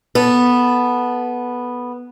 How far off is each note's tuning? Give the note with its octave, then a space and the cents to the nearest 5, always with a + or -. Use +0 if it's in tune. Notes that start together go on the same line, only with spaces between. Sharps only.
B3 -5 A4 -10